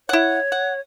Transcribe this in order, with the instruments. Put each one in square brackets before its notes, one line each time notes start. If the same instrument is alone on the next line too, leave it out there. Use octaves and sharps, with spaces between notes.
[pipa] E4 F#5 [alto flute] C#5
[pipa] F#5